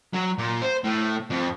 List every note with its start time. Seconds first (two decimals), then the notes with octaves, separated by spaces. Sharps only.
0.13 F#3
0.39 A#2
0.62 C5
0.84 A2
1.30 F2